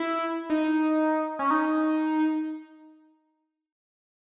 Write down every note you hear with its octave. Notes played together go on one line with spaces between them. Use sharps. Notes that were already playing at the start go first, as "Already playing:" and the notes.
Already playing: E4
D#4
C#4
D#4